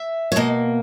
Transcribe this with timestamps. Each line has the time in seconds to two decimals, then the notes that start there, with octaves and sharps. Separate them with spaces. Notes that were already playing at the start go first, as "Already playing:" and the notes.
Already playing: E5
0.32 C#5
0.36 B2 A#3 D#5